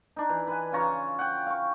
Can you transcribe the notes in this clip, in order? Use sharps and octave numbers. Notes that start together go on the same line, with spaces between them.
D4 D#4
E3
B4 G#5
C#3 F4 C#5 A#5
F#5 G5
F5 C#6